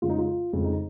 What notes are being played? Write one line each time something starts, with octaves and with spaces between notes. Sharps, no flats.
F2 C#3 G#3 F4
D#4
F4
F2 C#3 G#3 F4
D#4